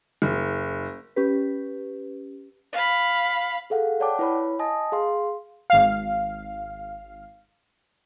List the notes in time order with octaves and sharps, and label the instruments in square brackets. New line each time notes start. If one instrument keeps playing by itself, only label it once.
[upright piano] F#1
[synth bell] C#4 G4 B4
[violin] F5 B5
[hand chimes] G#4 A4 F5 F#5
C#5 D5 F#5 G5 A5 D6
E4 B4 C#5 B5
D#5 G#5 A5 D#6 A#6
G#4 F5 C6
[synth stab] G#1 F5